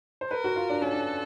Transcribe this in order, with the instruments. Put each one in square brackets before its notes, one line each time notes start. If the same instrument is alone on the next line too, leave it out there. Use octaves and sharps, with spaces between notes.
[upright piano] C5
[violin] A#4 [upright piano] B4
[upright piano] F#4
F4
D4
[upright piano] C#4 [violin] A4
[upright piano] D4